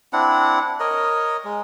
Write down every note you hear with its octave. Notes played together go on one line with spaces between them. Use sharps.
C4 D4 E4 F#5
A#4 C#5 D#5
G#3